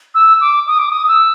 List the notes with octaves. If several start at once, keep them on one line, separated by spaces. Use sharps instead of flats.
E6
D6
D#6
D6
D#6
E6